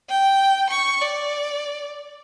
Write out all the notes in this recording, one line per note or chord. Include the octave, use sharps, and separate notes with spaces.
G5
C#6
D5